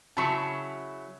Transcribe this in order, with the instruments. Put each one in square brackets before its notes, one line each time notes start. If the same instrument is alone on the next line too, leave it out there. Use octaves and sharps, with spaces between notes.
[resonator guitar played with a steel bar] C#3 F#3 E4 [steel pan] A5 B5 C#6